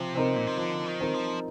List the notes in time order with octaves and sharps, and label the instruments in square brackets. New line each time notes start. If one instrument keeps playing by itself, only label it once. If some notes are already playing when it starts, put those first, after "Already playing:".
Already playing: [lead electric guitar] C3 [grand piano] F3
[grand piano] C4 D#4 A#4
[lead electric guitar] A#2
C3
[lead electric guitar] D3 [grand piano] F3
[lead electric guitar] D#3
[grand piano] C4 D#4 A#4
[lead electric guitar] F3